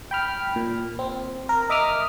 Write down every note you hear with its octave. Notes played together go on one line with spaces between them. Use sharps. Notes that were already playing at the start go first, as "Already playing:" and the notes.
G5 B5 F6
A#2
C4
A#4
D#5 E5 D6 D#6 F6